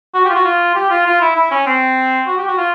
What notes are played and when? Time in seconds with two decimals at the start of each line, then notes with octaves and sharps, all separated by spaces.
0.14 F#4
0.25 G4
0.30 F4
0.35 F#4
0.45 F4
0.75 G4
0.90 F4
1.06 F4
1.21 E4
1.36 E4
1.51 C#4
1.67 C4
2.27 F#4
2.38 G4
2.47 F#4
2.57 F4